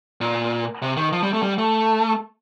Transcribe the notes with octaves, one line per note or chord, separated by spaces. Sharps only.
A#2
C3
D#3
F3
G3
A3
G3
A3